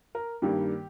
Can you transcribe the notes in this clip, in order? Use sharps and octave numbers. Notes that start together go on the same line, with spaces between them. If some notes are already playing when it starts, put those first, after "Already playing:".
A#4
G2 D#3 G3 A#3 G4